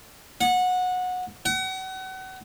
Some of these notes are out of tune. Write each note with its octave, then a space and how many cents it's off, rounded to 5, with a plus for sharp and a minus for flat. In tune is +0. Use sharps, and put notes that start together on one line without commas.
F#5 -20
F#5 +35